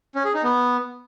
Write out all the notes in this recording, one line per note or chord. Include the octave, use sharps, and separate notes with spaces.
C#4
G#4
D#4
B3